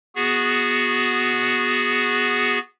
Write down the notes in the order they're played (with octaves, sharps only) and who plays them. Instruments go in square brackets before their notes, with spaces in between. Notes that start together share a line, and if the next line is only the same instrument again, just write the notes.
[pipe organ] B3 F#4 G#4